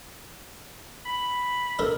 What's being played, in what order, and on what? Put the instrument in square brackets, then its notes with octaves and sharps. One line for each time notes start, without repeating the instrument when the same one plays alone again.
[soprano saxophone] B5
[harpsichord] D4 A4 A#4